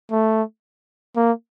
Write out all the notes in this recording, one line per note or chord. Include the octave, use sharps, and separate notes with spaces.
A3
A#3